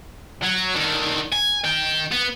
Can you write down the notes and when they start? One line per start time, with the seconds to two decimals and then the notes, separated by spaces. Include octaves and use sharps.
0.42 F#3
0.75 D3 D#3
1.32 G#5
1.64 D#3 G5
2.12 B3